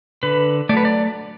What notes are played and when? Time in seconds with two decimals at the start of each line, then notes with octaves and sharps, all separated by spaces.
0.23 D3 B4
0.69 A3 D5
0.74 F#3 B4
0.85 D5